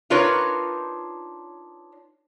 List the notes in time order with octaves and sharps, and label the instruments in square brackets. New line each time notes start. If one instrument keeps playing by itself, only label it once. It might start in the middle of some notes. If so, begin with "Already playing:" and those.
[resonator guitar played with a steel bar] D4 D#4 F4 A#4 B4 C#5